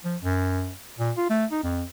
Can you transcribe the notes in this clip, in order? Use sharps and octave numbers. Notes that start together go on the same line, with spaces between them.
F3
F#2
A#2
F4
A3
D#4
F2